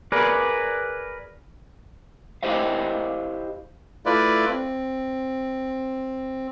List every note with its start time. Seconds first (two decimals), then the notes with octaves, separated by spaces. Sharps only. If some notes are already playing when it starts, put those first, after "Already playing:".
0.12 G#4 A#4 B4 D5
2.43 E4 G4 C5 D#5 F5
4.06 A3 E4 F4 B4 D5
4.49 C4